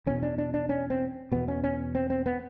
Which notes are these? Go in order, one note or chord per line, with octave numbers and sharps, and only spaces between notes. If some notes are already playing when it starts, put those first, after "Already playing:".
E2 B2 C#4
D4
D4
D4
C#4
C4
E2 B2 B3
C#4
C#4
C4
C4
B3